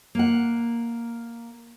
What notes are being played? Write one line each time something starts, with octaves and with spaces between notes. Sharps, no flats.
A#3 F#5